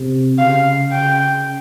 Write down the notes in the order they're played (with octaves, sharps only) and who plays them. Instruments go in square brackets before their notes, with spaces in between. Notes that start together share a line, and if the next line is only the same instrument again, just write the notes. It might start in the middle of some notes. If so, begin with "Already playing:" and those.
Already playing: [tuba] C3
[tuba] C#3 [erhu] F5
[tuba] C#3 [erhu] G5